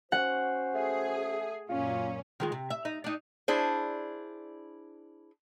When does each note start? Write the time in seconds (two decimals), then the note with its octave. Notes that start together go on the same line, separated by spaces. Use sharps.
0.12 C#4 F#4 C5 F#5
0.75 A3 G#4
1.69 F#2 A#2 C#4 F4
2.40 D#3 G#3 F4
2.52 C3
2.70 E5
2.85 D#4
3.04 D4 D#4
3.48 D4 E4 G#4 C5